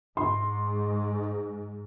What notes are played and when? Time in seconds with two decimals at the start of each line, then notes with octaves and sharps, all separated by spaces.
0.17 G#2 C6